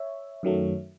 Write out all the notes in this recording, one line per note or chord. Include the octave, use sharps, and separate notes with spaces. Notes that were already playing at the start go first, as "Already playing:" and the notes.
Already playing: C#5 E5
F#2 D#3 F#3 A3